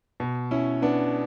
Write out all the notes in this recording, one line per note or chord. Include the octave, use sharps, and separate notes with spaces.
B2
C#4 E4
B3 D4